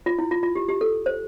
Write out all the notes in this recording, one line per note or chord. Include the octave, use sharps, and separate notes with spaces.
F4
E4
F4
F4
G4
G4
A4
C5